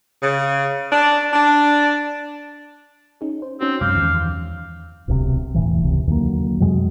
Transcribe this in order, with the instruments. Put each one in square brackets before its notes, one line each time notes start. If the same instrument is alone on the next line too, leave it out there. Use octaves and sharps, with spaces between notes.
[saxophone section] C#3
D4
D4
[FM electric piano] C#4 D#4 G#4
C5
[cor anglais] C4 [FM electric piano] C#4 D#4 F#4
[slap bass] F#2 C3 G#3 [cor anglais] F5 [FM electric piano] D6 G6
[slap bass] E2 D#3 F3
[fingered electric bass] D1 B1 A2 C3
E1 A2 E3
C#2 C3
D#2 D3 F#3 A#3
F2 C3 F#3 G#3